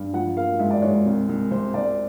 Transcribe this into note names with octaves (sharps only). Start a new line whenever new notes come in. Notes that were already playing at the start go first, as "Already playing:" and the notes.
Already playing: G2
F3 F#5
A#3 F5
G#2 E5
D5
G#2 C#5
C#5
C2
C2
C3 C5
C2 D5